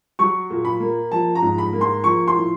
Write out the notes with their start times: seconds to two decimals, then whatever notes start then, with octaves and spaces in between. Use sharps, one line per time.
0.19 F#3 C#6
0.50 A#2
0.65 B5
0.80 A#3
1.11 F3 A5
1.35 A#5
1.42 G#2
1.58 B5
1.73 A#3
1.81 C6
2.04 F3 C#6
2.28 C6
2.36 A2